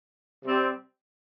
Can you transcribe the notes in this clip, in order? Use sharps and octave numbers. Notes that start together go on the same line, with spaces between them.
C3 G3 C4 G4